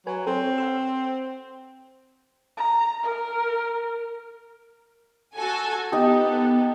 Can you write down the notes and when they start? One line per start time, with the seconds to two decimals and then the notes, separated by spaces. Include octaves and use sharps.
0.07 F#3 B4 G#5
0.27 C4 A4 C5 C#5
0.58 F#5 C6 E6
2.57 A#5
3.03 A#4
5.35 F#4 A4 G#5
5.92 B3 D#4 G4 A4